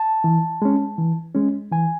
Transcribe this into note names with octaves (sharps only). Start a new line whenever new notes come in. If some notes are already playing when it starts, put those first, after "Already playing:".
Already playing: A5
E3
G#3 C#4
E3
G#3 C#4
E3 G#5